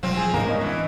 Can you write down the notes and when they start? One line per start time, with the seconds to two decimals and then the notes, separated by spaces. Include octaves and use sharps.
0.03 E1 F3 F#3 C4
0.17 G#4
0.34 D2 G#2 A#3 B3 D#4 A#4
0.46 G2 C#4 D#5
0.61 E3